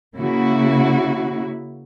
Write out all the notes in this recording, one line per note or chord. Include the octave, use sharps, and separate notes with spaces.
C#3 A#3 E4 F#4